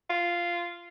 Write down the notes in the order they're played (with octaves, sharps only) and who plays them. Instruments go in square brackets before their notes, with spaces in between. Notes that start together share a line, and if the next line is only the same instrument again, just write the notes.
[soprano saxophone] F4